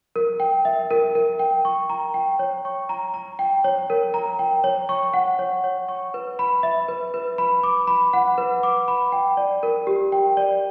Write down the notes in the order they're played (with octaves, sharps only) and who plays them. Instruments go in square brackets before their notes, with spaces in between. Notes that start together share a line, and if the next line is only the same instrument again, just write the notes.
[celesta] A#4
G5
E5
A#4
A#4
G5
C#6
A#5
G5
C#5
C#6
A#5
A#5
G5
C#5
A#4
A#5
G5
C#5
C#6
F#5
C#5
C#5
C#6
B4
B5
E5
B4
B4
B5
D6
B5
F#5
B4
D6
B5
G5
D5
A#4
G4
G5
D5